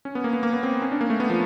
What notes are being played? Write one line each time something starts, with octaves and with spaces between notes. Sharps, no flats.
C#4
B3
A#3
B3
A#3
B3
C4
C#4
D4
A#3
A3
B3
F3